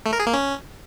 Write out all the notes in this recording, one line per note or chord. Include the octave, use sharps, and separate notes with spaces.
A3
A#4
G#4
A#3
C#4